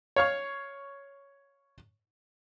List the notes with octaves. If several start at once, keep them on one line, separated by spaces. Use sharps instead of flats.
C#5 F5 C#6